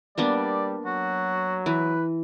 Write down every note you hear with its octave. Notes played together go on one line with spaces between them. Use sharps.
G3 A#3 B3 D4 D5
F#3 F#4
E3 B4